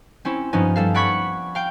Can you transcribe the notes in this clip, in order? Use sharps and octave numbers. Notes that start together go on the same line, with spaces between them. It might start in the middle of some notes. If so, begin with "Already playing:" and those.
C4 C#4 E4
G2 F3 B3 C#4 D#4
G3 A4 F5
D5 F#5 B5 C#6 G#6 B6
F5 G5